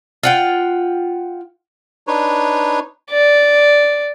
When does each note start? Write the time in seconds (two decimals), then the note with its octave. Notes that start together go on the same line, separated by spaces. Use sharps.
0.23 F4 F#5 G5
2.07 D4 D#4 B4 C#5
3.10 D5